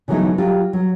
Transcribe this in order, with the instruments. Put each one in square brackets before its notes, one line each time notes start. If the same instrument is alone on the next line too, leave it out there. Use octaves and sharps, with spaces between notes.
[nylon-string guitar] C#3 E3 F#3 A3 B3 D#4
F#3 F4 G4
F#3